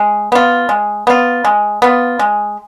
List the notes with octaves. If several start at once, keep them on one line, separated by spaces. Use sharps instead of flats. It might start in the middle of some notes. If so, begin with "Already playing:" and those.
Already playing: G#3
B3 F4
G#3
B3 F4
G#3
B3 F4
G#3